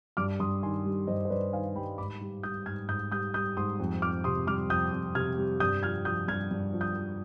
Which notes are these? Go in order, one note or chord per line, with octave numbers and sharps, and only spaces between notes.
G2 D6 F6
G2 C6 D#6
D#3 G#5 C6
G3
G2 C5 D#5
C5
G2 B4 D5
D#3 F5 G#5
G3 G5 B5
G#2 B5 D6
G3
G3 D#6 G6
G#2 F6 G#6
G#2 D#6 G6
G3 D#6 G6
G3 D#6 G6
G#2 C6 D#6
F2
F2 D6 F6
C3 C6 D#6
G3 D6 F6
F2 D#6 G6
F2
C3 F6 G#6
G3
G2 D#6 G6
F3 F6 G#6
F3 D#6 G6
G2 F6 G#6
G2
F3
D#6 G6
F3